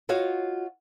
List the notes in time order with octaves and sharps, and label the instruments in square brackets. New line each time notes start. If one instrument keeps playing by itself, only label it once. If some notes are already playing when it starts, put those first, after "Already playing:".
[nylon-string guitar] F4 F#4 C#5 D#5 F5